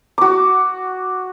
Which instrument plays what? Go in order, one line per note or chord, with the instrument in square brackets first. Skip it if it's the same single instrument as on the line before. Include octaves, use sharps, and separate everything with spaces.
[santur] F#4 D6